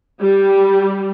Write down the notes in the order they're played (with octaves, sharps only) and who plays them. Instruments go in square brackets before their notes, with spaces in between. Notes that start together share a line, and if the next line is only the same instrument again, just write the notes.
[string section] G3